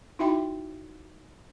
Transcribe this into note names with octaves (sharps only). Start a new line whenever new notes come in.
D#4 E4 F#4 E5 G5 B5